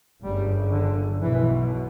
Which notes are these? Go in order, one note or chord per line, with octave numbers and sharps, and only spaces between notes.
G1 F#2 C#3 G3
D3
B1 B2 E3